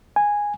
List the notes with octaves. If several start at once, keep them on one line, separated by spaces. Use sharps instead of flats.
G#5